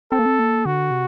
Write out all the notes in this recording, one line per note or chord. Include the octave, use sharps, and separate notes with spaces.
C4 A4
A#3
C4
A#3
D3 F#4
C3